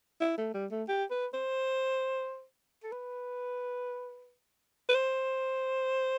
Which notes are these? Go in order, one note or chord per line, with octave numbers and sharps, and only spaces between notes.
E4
A3
G3
A3
G4
B4
C5
A4
B4
B4
C5